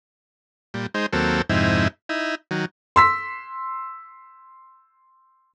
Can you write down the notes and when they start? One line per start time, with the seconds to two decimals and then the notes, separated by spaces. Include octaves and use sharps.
0.74 A#2 G3
0.95 G#3 D#4 C5
1.13 D#2 F#3 A#3 C4 A4
1.49 F2 G#2 C3 D#4 E4
2.09 D#4 E4
2.51 D#3 F#3
2.96 C6 E6 B6